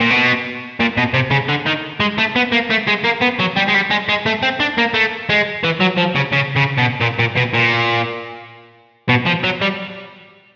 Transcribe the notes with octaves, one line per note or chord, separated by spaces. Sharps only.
A#2
B2
A#2
B2
C3
C#3
D3
D#3
G#3
A3
B3
A#3
A3
G#3
A#3
B3
F#3
G3
G#3
G3
G#3
G#3
A3
C4
D4
A#3
A3
G#3
E3
F#3
F3
C#3
C#3
C#3
B2
A#2
A#2
B2
A#2
B2
F3
F#3
G3